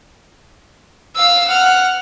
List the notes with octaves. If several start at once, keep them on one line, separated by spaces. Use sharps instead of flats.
F5 E6
F#5 F6